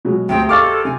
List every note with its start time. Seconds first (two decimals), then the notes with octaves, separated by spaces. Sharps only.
0.05 B2 F#3 G#3
0.29 D2 C3 C4 G#4 G5
0.49 A4 D#5 F5 C#6 D6 F6 A6
0.85 C3 G#5